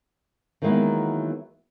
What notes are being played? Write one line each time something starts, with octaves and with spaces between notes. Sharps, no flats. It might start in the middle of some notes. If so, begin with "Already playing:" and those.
D#3 E3 F#3 G#3 A#3 B3